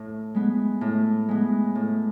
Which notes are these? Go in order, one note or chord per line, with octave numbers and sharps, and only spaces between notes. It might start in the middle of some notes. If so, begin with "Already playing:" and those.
Already playing: A2
G#3 B3
A2
G#3 B3
A2